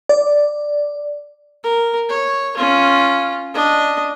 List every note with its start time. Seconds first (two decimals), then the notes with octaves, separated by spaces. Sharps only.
0.09 D5
1.63 A#4
2.09 C#5
2.57 C#4 F4
3.54 D4 D#5